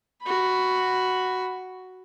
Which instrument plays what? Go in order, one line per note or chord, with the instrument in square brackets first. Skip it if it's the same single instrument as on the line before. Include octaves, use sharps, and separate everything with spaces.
[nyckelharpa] F#4 B5